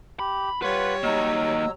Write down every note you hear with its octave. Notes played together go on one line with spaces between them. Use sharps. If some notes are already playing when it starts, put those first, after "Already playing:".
G4 B5
G3 F4 B4 C#5 F#5
F#3 A#3 D#4 D#5 A#5 E6